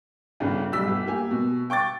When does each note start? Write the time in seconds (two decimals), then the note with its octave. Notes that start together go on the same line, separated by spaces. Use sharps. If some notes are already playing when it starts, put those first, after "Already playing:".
0.40 G1 G2 C#3
0.72 B1 G3 E6 B6
0.87 G1
1.06 A#3 G4 G#5
1.31 B2
1.70 G5 C#6 D6 A6